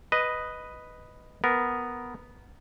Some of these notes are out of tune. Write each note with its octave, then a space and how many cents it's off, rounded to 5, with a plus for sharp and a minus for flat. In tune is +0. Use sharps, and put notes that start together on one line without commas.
B4 +0 D#5 +0
B3 +0 A#4 +0